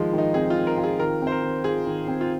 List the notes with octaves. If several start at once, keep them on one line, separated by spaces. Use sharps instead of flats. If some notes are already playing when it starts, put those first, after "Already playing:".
Already playing: D#3 F3 G#3 F4
D#3
D#4
C4 G#4
F4
D#3
A#4
F4
G#4
D#3 A#4
C4
C5
A#4
D#3
F4 G#4
D#3
C4
F4